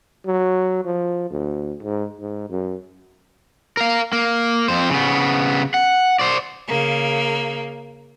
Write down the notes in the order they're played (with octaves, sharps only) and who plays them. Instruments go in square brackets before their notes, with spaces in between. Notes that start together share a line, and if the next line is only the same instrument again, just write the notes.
[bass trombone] F#3
F3
D2
G#2
G#2
F#2
[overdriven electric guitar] A#4 F5
A#3
F2 C5
C#3 B3
F#5
C5 D5
[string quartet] C#3 A#3